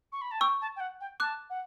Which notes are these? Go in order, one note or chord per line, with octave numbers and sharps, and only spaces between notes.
C#6
B5
A5
G5 C#6 E6
A5
G5
F#5
G5
A5 D6 F#6
F#5